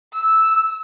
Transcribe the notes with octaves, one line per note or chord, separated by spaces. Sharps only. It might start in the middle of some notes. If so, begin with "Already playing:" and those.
E6